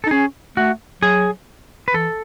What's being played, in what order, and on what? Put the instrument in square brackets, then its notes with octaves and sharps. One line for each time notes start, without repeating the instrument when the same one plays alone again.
[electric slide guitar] A4
[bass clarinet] D#4
[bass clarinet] C#4 [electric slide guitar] G#4
[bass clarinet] A3 [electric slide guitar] F#4
[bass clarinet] F#3 [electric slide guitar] G#4
[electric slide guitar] B4
[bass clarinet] E3 [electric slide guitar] A4